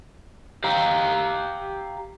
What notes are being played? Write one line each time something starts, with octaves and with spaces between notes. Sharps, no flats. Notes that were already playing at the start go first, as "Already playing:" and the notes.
G4 F5 A#5